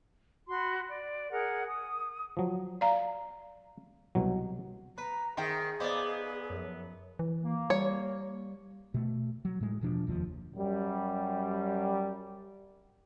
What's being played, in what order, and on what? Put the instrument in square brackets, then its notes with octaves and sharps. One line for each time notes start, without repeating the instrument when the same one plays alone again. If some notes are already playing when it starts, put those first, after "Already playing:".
[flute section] F#4 B5 C6
D5
G#4 A#4 F#5
D#6
[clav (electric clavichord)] F3 F#3
[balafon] D5 F5 A#5
[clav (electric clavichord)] C2 B2 F#3
[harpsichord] B4 [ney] A#5
[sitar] D#3 [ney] G#4 [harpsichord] C5 G5 [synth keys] E5
[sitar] B3 [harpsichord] C5 D5 [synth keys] D#5 F5 D6
[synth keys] F#2 F3
[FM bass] E3
[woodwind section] A#3
[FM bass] G3 [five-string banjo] C#5
[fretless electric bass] B2 A3
F#3
A2 G#3
E1 B2 F3 D4
F1 D#2 F3
[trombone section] F#2 G3